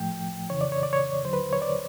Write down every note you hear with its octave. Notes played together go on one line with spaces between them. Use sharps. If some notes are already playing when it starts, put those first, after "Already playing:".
Already playing: A2 F3 A3 G5
F2 C#3 E3 C#5
D5
C#5
D5
C#5
D#2 D3 F#3 C5
B4
C#5
D5